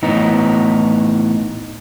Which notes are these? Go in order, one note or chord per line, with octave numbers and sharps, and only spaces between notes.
A2 E3 B3 D#4